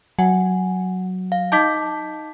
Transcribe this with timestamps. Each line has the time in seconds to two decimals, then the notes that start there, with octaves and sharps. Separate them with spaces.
0.19 F#3 F#5 G#5
1.32 F5
1.52 D#4 D#5 A5 D6 G6 B6